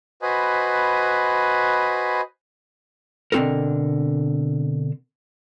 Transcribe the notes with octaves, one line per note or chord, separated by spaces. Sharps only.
F#4 B4 C5 D#5 G#5 B5
B2 D3 C4 F#4 A4 A#4